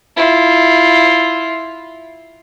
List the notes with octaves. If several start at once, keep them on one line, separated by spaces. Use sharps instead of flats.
E4 F4